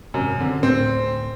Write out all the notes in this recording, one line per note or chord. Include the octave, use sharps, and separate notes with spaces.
G#1 F#2 C3
D3 C4
D2 A2 A3 C4